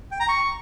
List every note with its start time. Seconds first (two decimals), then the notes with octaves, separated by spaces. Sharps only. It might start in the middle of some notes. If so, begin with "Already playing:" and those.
0.11 G5
0.20 A#5
0.29 C#6